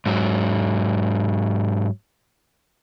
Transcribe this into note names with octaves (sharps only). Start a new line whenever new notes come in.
G#2 F#3